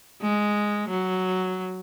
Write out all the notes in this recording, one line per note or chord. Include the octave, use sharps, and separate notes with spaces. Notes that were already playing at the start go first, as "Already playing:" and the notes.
G#3
F#3